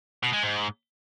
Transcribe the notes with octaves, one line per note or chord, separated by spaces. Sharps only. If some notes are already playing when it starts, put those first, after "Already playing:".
B2
G#3
G#2